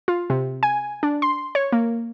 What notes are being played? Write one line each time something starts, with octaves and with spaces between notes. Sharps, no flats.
F4
C3
G#5
D4
C6
C#5
A#3